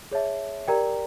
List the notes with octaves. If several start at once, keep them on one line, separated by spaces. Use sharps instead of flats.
G#4 C#5 E5 A5
G4 A#4 D5 G5 A#5